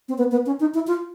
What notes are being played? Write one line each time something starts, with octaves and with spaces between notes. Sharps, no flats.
C4
B3
B3
C#4
D#4
E4
F4